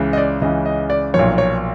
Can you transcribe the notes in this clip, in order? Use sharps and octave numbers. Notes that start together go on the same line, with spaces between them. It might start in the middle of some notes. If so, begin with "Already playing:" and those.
Already playing: C#2 C#3 E3
D#5
D5
C#2 C#3 E3 D#5
D#5
D5
B1 A#2 F3 C#5
C#5